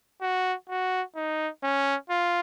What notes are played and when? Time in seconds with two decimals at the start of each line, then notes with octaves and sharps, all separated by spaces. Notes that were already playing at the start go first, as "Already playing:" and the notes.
0.21 F#4
0.70 F#4
1.16 D#4
1.63 C#4
2.09 F4